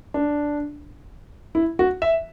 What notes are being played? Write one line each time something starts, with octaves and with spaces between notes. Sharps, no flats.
D4
E4
F#4
E5